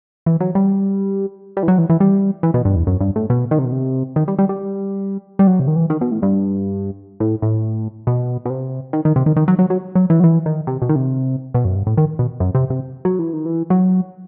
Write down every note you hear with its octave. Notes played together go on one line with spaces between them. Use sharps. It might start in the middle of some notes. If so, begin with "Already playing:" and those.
E3
F#3
G3
G3
E3
F#3
E3
E3
G3
E3
B2
G2
E2
F#2
G2
A2
B2
D#3
C3
B2
C3
D#3
G3
G3
G3
G3
F#3
C3
D#3
E3
D#3
B2
A2
G2
A2
A2
B2
B2
C3
D#3
D#3
C3
D#3
D#3
F#3
F#3
F#3
F#3
E3
F#3
E3
D#3
C3
B2
D#3
C3
B2
F#2
G2
A2
D#3
B2
F#2
C3
C3
F#3
E3
D#3
E3
F#3